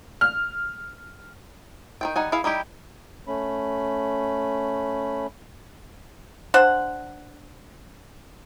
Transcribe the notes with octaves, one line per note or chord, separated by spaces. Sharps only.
F6
D#3 F3 G5
G3 D#4 F#5 G#5
E4 G#4 F5
G3 D#4 E4 G4
A3 C#4 B5
D4 C5 F#5